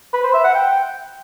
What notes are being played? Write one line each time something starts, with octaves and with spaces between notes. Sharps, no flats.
B4
C5
E5
F#5
G5